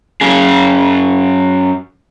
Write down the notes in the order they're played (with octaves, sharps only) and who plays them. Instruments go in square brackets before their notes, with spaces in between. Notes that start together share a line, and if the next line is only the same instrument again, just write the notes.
[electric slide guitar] F#2 C#4 G#4